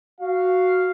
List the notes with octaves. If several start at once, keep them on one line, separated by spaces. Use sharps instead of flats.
F#4 F5